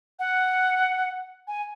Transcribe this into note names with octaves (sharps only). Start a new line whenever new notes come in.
F#5
G#5